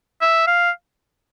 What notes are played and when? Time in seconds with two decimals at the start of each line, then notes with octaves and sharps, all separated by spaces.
0.21 E5
0.47 F5